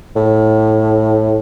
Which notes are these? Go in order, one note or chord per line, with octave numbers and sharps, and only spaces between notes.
A2